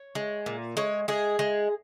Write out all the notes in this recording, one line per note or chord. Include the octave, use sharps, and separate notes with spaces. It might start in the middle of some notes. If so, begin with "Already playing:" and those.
Already playing: C#5
G#3
A#2
G#3 C#5
G#3 G#4
G#3